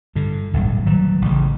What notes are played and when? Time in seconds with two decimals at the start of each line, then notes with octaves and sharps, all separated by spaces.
0.16 G2 D3
0.53 D1 G#1 G2 A#2
0.86 D#3 F#3 G3
1.22 A1 C#3